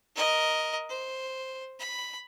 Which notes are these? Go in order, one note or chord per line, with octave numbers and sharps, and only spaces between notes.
A#4 D#5
C5
B5